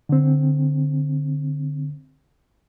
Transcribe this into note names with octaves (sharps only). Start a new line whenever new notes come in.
D3 C4